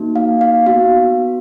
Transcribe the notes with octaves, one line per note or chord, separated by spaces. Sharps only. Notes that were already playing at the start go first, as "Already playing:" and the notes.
Already playing: A#3 D#4 F#4
F5
F5
B3 F#4 F5